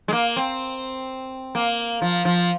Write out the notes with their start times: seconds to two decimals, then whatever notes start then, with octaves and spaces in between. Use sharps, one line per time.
0.08 G#3
0.13 A#3
0.36 C4
1.55 A#3
2.02 F3
2.25 F3